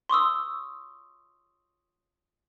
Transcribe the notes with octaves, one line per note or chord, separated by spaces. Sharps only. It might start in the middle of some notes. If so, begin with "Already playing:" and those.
C6 C#6 D#6 E6